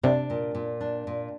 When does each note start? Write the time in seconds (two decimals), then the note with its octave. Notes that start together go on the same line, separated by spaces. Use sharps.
0.03 C3 D4
0.30 A#2
0.55 A#2
0.81 D4
1.07 A#2